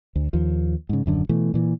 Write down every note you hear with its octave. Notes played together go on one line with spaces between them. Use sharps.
D2
D#2 F3
G#2 C#3
D#1 F#2 D3
B2 E3 A3
A#2 E3